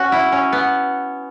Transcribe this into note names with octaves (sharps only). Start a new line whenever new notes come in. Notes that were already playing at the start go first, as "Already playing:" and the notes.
Already playing: B2 C#4 F#4
E4
C#4
B3